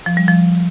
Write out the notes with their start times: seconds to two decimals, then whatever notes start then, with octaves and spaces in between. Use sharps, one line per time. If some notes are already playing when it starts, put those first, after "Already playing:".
0.06 F3
0.17 G3
0.28 F3